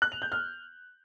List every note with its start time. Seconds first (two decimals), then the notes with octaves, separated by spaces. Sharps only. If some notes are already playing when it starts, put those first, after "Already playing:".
0.02 F#6
0.12 F7
0.22 G6
0.32 F6